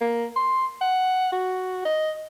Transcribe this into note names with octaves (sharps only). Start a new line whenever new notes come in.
A#3
C6
F#5
F#4
D#5